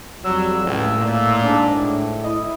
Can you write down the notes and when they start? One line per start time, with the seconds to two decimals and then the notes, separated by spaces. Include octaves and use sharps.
0.24 F2 F#3 G3 E6
0.66 C#2 A2
0.98 A#2
1.42 G#2 D4
1.73 A2
2.24 E4 D#5